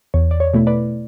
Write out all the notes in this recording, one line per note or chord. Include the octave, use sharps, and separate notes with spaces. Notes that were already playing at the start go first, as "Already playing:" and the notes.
E2 C#5
D5
C#5
B2 A3 E4
B4 D5